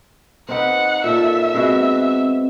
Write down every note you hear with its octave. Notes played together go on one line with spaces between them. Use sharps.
C4 D#4 B4 F#5
A#2 A4 E5
G#3 B3 C4 F#4